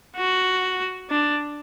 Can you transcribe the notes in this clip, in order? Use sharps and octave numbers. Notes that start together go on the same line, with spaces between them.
F#4
D4